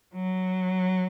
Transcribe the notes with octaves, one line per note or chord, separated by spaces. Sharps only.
F#3